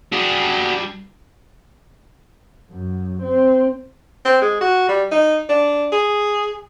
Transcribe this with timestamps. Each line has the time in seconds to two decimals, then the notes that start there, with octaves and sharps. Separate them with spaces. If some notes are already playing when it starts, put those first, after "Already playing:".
0.12 G3 D4 F#4 G#4
2.71 F#2
3.22 C4
4.25 C4
4.42 G#3
4.61 F#4
4.89 G3
5.12 D#4
5.49 D4
5.92 G#4